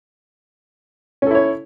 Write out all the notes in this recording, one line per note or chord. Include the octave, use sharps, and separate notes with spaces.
C#4 E4 A4 C#5